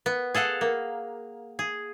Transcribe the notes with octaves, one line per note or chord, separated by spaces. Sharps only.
B3
G#4 A4 F5 F#5
A#3
G#4